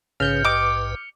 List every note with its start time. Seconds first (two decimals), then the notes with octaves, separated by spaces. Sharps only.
0.20 A#1 G#2 C#3 B4 F6 G6 C#7
0.45 G4 D#5 D6